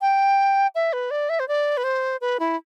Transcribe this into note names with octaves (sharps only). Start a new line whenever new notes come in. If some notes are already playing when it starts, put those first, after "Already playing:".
G5
E5
B4
D5
E5
C5
D5
B4
C5
B4
E4